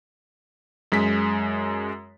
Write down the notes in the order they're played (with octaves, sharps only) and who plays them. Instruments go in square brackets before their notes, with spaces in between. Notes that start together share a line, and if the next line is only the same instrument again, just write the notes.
[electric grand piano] F#2 G#3 B6